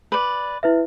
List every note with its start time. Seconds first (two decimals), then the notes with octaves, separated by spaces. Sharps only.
0.12 B4 D5
0.63 E4 B4 E5